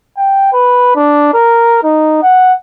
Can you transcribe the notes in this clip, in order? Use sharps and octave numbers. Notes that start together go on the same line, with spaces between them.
G5
B4
D4
A#4
D#4
F#5